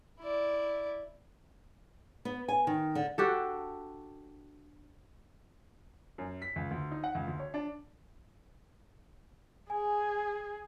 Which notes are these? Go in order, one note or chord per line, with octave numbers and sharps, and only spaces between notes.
E4 D5
B3
G#5
D#3
D3
D4 F#4 G4 A4
F#2
B6
C#2
D2
D#4
F#5
C#2
D2
C#5
D4
G#4 G#5